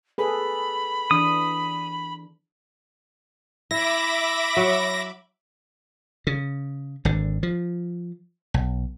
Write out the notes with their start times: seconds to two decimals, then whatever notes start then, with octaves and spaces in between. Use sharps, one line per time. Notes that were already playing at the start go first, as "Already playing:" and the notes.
0.18 G#4 A4 B4 B5
1.11 E3 D4 D#6
3.71 E4 E5 B5 D6 A#6
4.57 F#3
6.27 C#3
7.05 G#1 D3
7.43 F3
8.54 B1